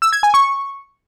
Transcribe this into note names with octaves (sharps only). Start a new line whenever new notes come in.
E6
G#6
G#5
C#6